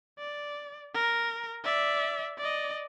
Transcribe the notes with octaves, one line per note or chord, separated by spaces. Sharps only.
D5
A#4
D5 E5
D5 D#5